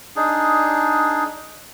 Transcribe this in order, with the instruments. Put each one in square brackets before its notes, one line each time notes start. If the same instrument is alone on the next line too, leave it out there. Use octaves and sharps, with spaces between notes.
[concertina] D4 D#4 G#4